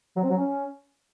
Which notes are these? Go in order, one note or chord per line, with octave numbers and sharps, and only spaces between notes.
F#3
C4
F#3
C#4